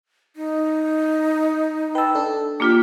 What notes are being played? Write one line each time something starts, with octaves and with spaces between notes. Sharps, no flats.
D#4
B4 G5 A5 E6
D4 A4
A#3 D4 F4 G4 D6 B6